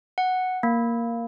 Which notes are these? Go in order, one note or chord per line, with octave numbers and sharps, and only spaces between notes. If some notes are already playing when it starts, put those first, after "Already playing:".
F#5
A#3